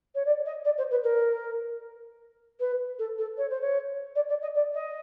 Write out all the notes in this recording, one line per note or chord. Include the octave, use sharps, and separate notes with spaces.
C#5
D5
D#5
D5
C5
B4
A#4
B4
A4
A4
C#5
C5
C#5
D5
D5
D#5
D5
D#5